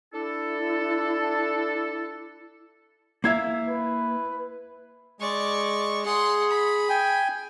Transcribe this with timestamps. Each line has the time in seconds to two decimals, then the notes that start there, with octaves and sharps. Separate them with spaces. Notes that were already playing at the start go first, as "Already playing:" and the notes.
0.13 D4 E4 A4
3.24 A#3 E4 E5 F5 G#6 C7
3.68 B4
5.20 G#3 D5 C#6
6.05 G#4 F#5 C6
6.50 B5
6.89 G5 G#5